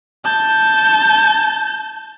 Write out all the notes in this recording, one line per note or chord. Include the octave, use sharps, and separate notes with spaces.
A5 G6